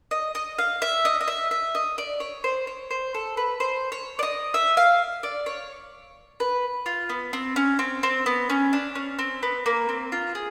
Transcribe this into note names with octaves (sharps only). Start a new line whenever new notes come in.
D#5
D#5
F5
E5
D#5
D#5
E5
E5
D#5
D5
C#5
C5
C#5
C5
A4
B4
C5
C#5
D5
D#5
E5
F5
D5
C#5
B4
F4
B3
C4
C#4
C4
C4
B3
C#4
D4
C#4
C4
B3
A#3
C4
F4
G#4